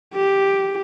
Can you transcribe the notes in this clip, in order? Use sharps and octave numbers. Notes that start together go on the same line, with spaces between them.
G4